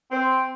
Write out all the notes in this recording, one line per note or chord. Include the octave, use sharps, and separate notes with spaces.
C4